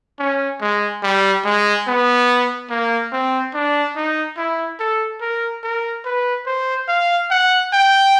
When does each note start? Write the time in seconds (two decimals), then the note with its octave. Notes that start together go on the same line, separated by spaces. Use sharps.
0.19 C#4
0.61 G#3
1.03 G3
1.45 G#3
1.87 B3
2.70 A#3
3.12 C4
3.54 D4
3.96 D#4
4.37 E4
4.80 A4
5.21 A#4
5.63 A#4
6.05 B4
6.46 C5
6.88 F5
7.30 F#5
7.73 G5